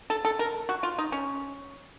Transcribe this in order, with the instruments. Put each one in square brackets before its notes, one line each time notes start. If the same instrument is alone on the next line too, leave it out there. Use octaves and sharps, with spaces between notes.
[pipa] A4
A4
A#4
F#4
F4
D#4
C#4